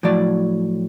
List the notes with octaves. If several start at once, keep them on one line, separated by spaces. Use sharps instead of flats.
A2 F3 F#3 D5